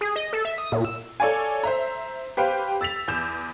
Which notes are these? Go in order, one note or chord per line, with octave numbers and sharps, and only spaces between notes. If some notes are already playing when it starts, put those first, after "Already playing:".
G#4
D#5
A4
E5
D#6
A#2
E6
A4 C#5 D5 F5 G#5
C5 E5 A#5
G4 B4 C5 F5 G5
E6 A6 B6 F7
E2 G6 E7